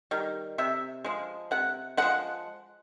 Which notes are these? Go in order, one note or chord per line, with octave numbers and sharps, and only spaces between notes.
D#3 G3
C3 E5
F3 G#3
C3 F#5
F3 G#3 F#5